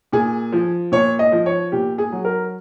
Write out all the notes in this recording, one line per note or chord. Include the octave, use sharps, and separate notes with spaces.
A#2 G#4
F3
A#2 C#5
D#5
F3
C#5
A#2 G4
G#4
F#3
A#4